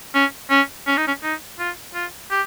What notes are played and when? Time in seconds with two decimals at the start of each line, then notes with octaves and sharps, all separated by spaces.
0.14 C#4
0.51 C#4
0.87 C#4
0.97 D#4
1.07 C#4
1.23 D#4
1.59 F4
1.95 F4
2.31 G4